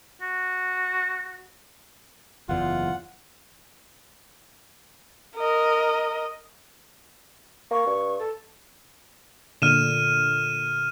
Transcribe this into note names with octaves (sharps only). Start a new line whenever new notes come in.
F#4
F#1 E2 F4 F#5
A#4 D#5
A#3 C#6
G2
A4
A#2 D3 F6 D#7 E7